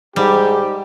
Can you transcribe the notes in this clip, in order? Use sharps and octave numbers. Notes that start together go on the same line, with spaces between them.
G#2 G3 G4